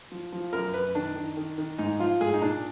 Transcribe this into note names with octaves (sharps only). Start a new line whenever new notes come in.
F3
F3
F#2 A#4
F#2 B4
D#3 D4
D#3
D#3
D#3
G#2 D#4
F3 F4
G#2 G#4
D#4
A#2 D4